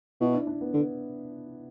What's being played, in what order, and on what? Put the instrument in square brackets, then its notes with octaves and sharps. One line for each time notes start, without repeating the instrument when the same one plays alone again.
[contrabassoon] B2 [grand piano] E4
[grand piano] D4
D4
B3
[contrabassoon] D3 [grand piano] B3